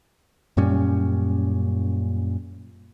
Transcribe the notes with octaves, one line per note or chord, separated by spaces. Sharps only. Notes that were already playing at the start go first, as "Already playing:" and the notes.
F#2 A#2 G3 C#4